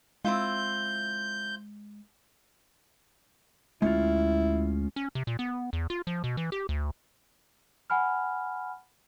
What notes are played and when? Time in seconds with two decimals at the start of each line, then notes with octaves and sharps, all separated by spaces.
0.25 G#3 C4 E4 F4 G6
3.82 D2 G#3 C#4 E4 F4
4.96 C#4
5.15 C3
5.27 A#2
5.39 B3
5.73 E2
5.90 F4
6.07 F3
6.24 B2
6.37 E3
6.52 G4
6.69 D2
7.90 F#5 G#5 B5 F6